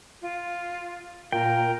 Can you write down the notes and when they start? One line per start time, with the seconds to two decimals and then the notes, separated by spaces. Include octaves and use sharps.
0.22 F4
1.32 A#2 F4 A#4 G5